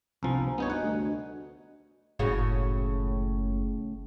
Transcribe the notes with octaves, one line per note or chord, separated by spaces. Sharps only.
G1 C2 F3 G#5 A#5
G2 B3 D#4 C#5
F#4 D#5 F#5
D2
F#1 A2 C#3 F#4